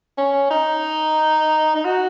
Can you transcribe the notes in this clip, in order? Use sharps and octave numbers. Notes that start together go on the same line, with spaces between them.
C#4
D#4
D#4
F#4